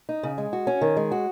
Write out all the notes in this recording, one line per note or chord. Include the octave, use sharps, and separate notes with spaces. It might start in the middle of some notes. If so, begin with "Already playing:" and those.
D#4
C#3
G#3
F#4
C#4
D#3
G#3
F#4